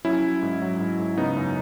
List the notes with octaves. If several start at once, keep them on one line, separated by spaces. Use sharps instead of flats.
F#3 C#4 E4
F#3
G#2
F#3
G#2
G#2
C#3 B3 D#4
F#2